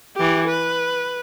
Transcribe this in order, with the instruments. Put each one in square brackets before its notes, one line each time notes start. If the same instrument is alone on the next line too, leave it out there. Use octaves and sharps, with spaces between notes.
[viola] E3 G4
B4